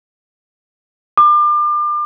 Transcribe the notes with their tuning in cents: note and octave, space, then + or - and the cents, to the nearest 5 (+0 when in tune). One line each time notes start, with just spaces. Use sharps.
D6 +35